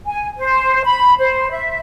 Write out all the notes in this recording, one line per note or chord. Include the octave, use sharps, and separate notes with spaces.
G#5
C5
B5
C5
E5